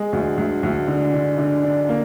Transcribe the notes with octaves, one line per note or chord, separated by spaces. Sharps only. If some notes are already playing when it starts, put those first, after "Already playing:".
Already playing: G#3
D2
D2
D2
D3
D3
D3
D4
A#3